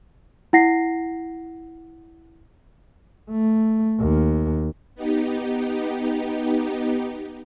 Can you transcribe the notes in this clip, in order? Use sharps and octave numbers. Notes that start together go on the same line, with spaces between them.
E4 F#5 A#6 C7
A3
D#2
B3 D#4 G4